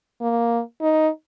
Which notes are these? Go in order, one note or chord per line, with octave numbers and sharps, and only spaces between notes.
A#3
D#4